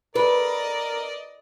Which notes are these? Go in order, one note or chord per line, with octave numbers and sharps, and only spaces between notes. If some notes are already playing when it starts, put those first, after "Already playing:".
A#4 B4 D5 D#5